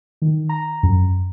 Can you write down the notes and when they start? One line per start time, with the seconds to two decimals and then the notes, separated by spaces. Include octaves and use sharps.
0.22 D#3
0.49 A#5
0.83 F#2